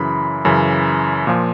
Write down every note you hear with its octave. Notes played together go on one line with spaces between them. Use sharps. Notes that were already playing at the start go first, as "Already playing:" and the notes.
Already playing: F#2 C#3 E3 B5
F#2 C#3 E3
A#2 F3